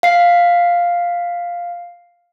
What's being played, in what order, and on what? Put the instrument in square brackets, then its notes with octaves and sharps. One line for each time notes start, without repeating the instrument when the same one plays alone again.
[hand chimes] F5 C7